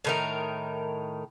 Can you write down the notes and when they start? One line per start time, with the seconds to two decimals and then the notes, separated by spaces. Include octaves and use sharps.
0.05 A2 D#3 A#4